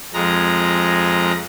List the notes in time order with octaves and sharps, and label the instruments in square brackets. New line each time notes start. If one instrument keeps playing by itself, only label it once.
[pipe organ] F2 G#3 A#5